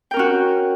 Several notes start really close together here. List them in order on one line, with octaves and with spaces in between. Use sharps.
G5 A#4 C#4 F#4